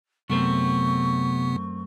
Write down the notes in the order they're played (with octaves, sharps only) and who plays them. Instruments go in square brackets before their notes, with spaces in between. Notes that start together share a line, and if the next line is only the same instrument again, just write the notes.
[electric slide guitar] F#2 A3 C4 [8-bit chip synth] C3 B3 [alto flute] C#6